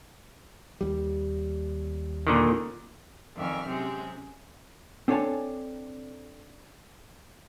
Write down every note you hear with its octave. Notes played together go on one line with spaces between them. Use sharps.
D#2 G3
A#2 D3 D#3
F2 D#3 D5 E5 G#5 F6
C3 F#3 G#3 C4 C#4
C4 D4 A4 C#5 G#5 A5